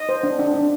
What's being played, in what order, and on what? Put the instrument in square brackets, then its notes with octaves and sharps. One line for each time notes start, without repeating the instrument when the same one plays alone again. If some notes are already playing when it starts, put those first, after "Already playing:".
Already playing: [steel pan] D#5
C5
D4
D4
D4